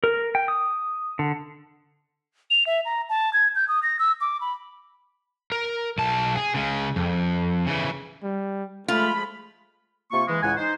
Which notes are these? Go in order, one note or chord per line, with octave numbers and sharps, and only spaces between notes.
A#4
G5
D#6
D3
F7
E5
A#5
A5
G#6
G6
D#6
A#6
E6
D6
B5
A#4
B1 A5
G#4
C#3 G#3
F2
C#3 E3
G3
F3 G#3 A3 F4 B5
C3 A#3 F4 C#6
E3 G#3
C#2 A2 G#3 F#5 G#5
D#4 C5